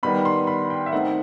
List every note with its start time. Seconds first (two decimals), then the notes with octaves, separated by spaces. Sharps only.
0.03 D#3 G3 B3 B5
0.25 C6
0.47 B5
0.70 G5
0.86 E5
0.92 D#3 A3 C4 D#4 F#5